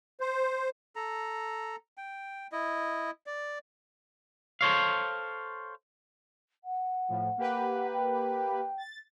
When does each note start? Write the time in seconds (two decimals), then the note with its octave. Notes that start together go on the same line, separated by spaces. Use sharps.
0.21 C5
0.96 A4 A#5
1.97 G5
2.52 E4 D#5
3.26 D5
4.61 A4 C5 C#5 F5
6.64 F#5
7.09 A2 F3
7.37 A#3 G4 B4
7.92 G5
8.78 A6